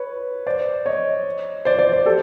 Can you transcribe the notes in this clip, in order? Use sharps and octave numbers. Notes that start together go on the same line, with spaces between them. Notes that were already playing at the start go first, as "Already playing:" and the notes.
Already playing: B4 C#5
C5 D5
C#5 D#5
C5 D5
C5 D5
C5 D5
G4 A4